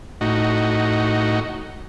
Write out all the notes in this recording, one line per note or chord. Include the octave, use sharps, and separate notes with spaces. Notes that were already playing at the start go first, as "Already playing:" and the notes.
A2 D#4 F#4